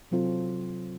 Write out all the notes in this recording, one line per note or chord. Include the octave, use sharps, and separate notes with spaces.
C3 F#3 C4 F4 A4